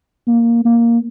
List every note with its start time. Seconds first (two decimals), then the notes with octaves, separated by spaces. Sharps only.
0.28 A#3
0.65 A#3